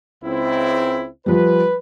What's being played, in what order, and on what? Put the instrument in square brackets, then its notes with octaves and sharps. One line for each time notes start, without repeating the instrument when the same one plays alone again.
[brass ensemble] C#2 C4 E4
[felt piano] F3 G3 [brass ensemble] B4